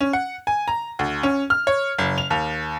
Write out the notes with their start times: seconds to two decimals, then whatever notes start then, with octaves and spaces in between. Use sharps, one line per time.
0.01 C#4
0.13 F#5
0.47 G#5
0.68 A#5
0.99 D2
1.23 C#4
1.50 F6
1.67 C#5
1.98 F#1
2.18 F7
2.30 D#2